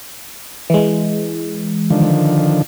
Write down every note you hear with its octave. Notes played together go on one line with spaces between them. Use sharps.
E3 G#3
D3 D#3 F3